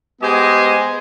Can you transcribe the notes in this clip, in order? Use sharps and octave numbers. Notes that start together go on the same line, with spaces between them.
G#3 B3 G4 C5 D#5 G#5